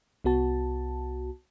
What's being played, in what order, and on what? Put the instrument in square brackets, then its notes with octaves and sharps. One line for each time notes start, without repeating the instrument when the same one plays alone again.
[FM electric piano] C2 B3 F#4 A5